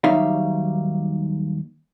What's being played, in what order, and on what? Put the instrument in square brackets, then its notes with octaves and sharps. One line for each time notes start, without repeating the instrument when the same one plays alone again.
[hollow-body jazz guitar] D#2 F#3 G3 D#4 E5 F5